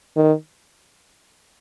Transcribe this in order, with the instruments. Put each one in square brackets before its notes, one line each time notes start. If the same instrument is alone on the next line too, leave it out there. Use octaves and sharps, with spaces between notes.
[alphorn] D#3